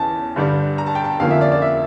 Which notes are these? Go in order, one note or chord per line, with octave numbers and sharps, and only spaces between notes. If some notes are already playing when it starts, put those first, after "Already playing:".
Already playing: E2 E3 C#4 A5
G2 D3 G3 D4
A#5
A5
G5
A5
F2 D3 F3 A#3 C#4 F5
E5
D5
D5
E5